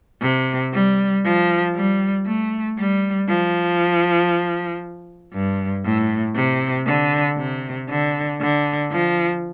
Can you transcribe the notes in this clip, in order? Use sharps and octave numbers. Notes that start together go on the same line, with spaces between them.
C3
G3
F3
G3
A3
G3
F3
G2
A2
C3
D3
C3
D3
D3
F3